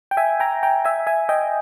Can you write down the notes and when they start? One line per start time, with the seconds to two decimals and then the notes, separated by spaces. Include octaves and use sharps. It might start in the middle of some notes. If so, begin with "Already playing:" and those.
0.11 G5
0.17 E5 G#5
0.40 G5 A#5
0.63 G5 A#5
0.85 E5 G#5
1.07 E5 G#5
1.29 D#5 G5